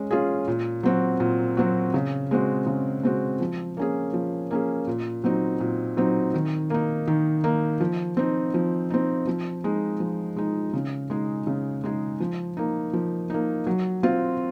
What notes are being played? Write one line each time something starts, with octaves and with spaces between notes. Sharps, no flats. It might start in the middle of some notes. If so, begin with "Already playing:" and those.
Already playing: G#3 C#4
C#4 F4 G#4
A#2
F#3 C4 F#4
A#2
F#3 C4 F#4
C#3
G#3 C4 F#4
C#3
G#3 C4 F#4
F3
A#3 C#4 G#4
F3
A#3 C#4 G#4
A#2
F#3 C4 D#4
A#2
F#3 C4 D#4
D#3
A#3 D#4
D#3
A#3 D#4
F3
C4 D#4
F3
C4 D#4
F3
G#3 D#4
F3
G#3 D#4
C#3
G#3 D#4 G#4
C#3
G#3 D#4 G#4
F3
A#3 D#4
F3
A#3 D#4
F#3
C4 F4